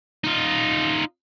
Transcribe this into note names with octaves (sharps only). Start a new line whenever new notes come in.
D#4 F4